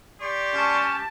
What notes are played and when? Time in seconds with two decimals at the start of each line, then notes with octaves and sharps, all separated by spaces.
0.21 G4 D5 C6 C#6
0.54 C#4 A5